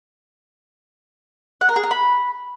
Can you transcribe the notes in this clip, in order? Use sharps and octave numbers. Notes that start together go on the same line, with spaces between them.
F#5
A#4
G#4
A#4
B5